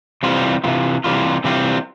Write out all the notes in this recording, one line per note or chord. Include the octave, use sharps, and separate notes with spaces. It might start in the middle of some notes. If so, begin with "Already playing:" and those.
C3 E3 G3 C4 F4
C3 E3 G3 C4 F4
C3 E3 G3 C4 F4
C3 E3 G3 C4 F4